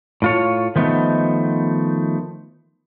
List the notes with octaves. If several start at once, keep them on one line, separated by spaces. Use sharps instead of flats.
A2 F4 C#5
D#3 F3 A3 B3 D#4